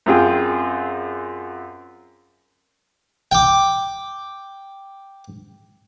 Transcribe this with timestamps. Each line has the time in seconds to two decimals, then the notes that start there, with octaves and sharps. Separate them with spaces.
0.06 F#2 C4 F4 G#4 G5
3.32 G5 D6